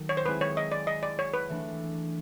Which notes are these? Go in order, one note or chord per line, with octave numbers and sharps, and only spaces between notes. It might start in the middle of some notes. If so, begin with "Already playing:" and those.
Already playing: D#3 F#3 A3
C#5
C5
G#3 C4 E4 G#4 B4
C#5
D#5
D5
D#5
D5
C#5
B4
E3 A3 D4